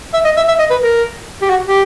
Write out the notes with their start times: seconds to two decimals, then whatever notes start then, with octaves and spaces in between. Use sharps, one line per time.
0.14 E5
0.25 D#5
0.37 E5
0.48 E5
0.59 D#5
0.71 B4
0.82 A#4
1.42 G4
1.50 F#4
1.67 G4